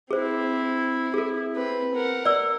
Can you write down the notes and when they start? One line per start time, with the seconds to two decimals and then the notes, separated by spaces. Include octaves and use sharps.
0.11 C4 E4 G#4 C5
1.14 E4 G#4 A4
1.56 C4 B4
1.94 A#4 F#5
2.25 D5 E6